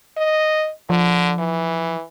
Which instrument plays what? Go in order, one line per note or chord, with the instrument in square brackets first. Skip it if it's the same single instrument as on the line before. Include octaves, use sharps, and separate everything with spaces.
[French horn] D#5
[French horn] D3 [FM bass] F3
[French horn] E3